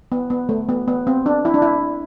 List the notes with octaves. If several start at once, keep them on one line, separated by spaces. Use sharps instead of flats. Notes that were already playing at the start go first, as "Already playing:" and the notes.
B3
B3
A3
B3
B3
C4
D4
E4
D4
E4